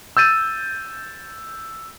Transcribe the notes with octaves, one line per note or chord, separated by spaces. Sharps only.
E6 G6 A6 D#7